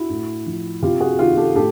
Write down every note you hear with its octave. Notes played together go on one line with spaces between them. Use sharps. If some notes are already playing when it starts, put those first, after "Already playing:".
Already playing: E4 F#4
A2
F3
C3 F4 G4
F#4 G#4
D#3 F4 G4
G4 A4
A2 G4 A4